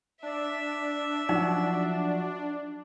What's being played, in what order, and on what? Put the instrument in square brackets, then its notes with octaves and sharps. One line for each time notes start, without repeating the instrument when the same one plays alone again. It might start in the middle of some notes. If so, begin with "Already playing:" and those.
[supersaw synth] D4 [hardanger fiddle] E5
[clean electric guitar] F3 F#3 F#4 [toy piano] D#4